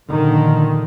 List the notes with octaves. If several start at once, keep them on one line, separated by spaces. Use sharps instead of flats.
A#1 D3 D#3